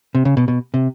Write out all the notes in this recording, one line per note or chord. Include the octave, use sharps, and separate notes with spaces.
C3
C#3
B2
B2
C3